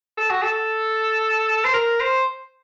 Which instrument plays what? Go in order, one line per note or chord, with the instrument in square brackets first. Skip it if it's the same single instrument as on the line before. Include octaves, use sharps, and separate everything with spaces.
[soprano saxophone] A4
F#4
A4
C5
A#4
C5